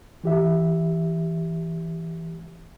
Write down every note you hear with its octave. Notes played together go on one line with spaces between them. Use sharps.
E3 G4 E5